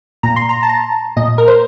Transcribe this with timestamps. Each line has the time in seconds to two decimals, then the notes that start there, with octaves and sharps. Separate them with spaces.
0.23 A#2 A#5
0.36 C6
0.49 A#5
0.63 A5
0.69 A#5
1.17 A#2 D#5
1.38 A#4
1.48 C5